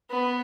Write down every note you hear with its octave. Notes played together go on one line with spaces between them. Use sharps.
B3